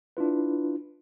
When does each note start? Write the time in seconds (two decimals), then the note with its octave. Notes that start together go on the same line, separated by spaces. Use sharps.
0.17 D4 E4 F4 B4